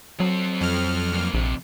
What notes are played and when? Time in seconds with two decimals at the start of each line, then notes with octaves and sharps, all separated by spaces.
0.20 F#3 C4 A4
0.61 F2 F6
1.12 G#2 A#3
1.34 A#1 F2 C3